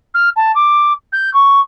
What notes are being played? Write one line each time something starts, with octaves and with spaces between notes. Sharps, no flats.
F6
A5
D6
G6
C#6